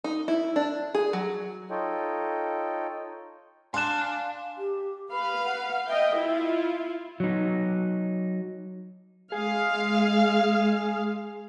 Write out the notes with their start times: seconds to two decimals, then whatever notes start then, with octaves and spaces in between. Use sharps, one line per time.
0.04 D#4
0.28 E4
0.56 D4
0.94 G#4
1.13 F#3
1.70 D#4 F4 A4 C#5 D#5 G5
3.74 D4 F5 G#5 C6 F#6 E7
4.58 G4
5.12 B4 F5 B5
5.45 F#5
5.87 D#5 E5 G5
6.17 E4 F4
7.20 F#3 D#4
9.32 G#3 G#4 F5